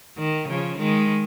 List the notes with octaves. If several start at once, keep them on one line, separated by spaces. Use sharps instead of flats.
D#3
C#3 F3
D#3 G#3